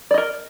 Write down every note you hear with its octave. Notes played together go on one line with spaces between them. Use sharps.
A#4 D5 D#5